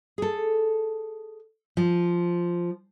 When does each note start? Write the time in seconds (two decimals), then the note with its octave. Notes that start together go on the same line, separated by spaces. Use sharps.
0.18 G#4 A4
1.77 F3